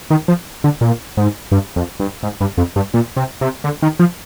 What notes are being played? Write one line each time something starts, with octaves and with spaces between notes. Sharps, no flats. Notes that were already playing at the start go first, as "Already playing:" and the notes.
D#3
F3
D3
A#2
G#2
G2
F2
G2
G#2
G2
F2
G2
A#2
C3
C3
D3
D#3
F3